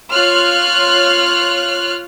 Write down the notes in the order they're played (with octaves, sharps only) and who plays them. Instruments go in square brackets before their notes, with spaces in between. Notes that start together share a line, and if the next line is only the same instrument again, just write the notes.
[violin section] F4 C#5 F6 F#6